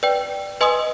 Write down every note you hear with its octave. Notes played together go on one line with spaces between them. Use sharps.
B4 D5 G5
B4 D#5 G#5 C6 D#6